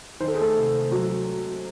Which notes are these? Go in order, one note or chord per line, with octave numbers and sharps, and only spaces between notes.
D#3 C5
A4
G#4
A3 A4
C3
F#3 F#4